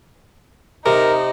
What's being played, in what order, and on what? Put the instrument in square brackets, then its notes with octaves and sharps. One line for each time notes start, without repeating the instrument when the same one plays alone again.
[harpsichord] C3 [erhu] D#4 [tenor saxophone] A#4